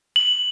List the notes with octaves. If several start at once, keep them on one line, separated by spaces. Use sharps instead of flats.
F#7